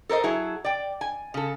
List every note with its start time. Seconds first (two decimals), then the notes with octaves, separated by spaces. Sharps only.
0.09 A4 A#4 C5 D#5
0.24 F#3 E4 G#4 A4
0.65 D5 G5
1.01 G#5
1.34 C#3 A4